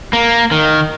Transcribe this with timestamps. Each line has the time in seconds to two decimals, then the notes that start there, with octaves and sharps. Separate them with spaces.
0.13 A#3
0.51 D#3